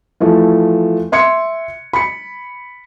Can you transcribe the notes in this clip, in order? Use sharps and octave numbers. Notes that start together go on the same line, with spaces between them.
E3 F3 A3
E5 C6 G#6 C#7
B5 C#7